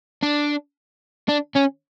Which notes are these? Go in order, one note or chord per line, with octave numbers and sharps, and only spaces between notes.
D4
D4
C#4